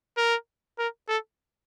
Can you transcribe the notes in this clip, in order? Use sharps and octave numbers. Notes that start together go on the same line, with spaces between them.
A#4
A#4
A4